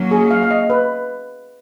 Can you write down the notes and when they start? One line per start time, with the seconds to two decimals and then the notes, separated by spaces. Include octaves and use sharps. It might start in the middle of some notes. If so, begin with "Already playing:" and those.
Already playing: F#3 A#3 C#4
0.11 G#4
0.31 F5
0.43 F5
0.51 D#5
0.70 B4